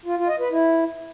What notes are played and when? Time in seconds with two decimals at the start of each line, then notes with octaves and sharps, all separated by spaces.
0.05 F4
0.17 F4
0.28 D#5
0.39 B4
0.51 E4